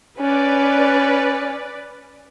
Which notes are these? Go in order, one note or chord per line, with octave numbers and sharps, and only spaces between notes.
C#4 B4 D5